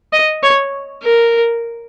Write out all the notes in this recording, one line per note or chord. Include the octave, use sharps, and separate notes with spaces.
D#5
C#5
A#4